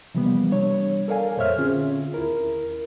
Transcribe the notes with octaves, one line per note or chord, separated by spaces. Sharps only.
C3 E3 F3 G3 A#3 B3
G3 D4 C#5
A4 A#4 D5 F5 G#5
F2 A#2 C5 C#5 E5 F6
D3 C4 C#4 F4 G#4
D#2 E4 A#4